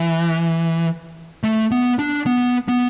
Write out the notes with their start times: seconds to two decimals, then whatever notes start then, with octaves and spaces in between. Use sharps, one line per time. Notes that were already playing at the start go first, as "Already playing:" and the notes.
Already playing: E3
1.43 A3
1.71 B3
1.99 D4
2.26 B3
2.68 B3